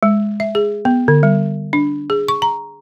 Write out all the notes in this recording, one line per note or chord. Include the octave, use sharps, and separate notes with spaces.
G#3
E5
G#4
B3
D3
G3
D4
G#4
C#6
A#5